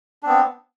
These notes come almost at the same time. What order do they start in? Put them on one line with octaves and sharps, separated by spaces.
D4 C4 B3